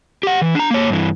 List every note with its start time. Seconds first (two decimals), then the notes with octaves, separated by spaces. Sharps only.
0.23 G4 F#5
0.42 E3
0.55 D4 A#5
0.71 A#3 C#5
0.90 G2 E3